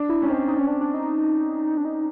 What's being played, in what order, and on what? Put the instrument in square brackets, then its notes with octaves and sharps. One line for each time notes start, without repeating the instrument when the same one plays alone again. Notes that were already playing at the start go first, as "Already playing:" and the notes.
Already playing: [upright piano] D4
[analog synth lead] E4
[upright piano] C#4
[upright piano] C4 [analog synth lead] D#4
[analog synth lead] D#4
C#4
D4
D4
D#4
D4
D#4